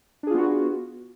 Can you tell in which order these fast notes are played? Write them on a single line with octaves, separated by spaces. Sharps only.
D4 G#4 F4 B3 F#4